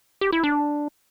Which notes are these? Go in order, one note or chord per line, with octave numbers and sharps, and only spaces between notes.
G4
E4
D4